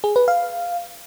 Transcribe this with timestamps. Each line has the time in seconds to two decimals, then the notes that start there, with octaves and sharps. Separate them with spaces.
0.04 G#4
0.16 B4
0.28 F5